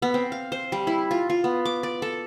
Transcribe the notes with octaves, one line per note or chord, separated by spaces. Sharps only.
B3
C4
F5
C5
G3
E4
F4
F4
B3
D6
D5
A4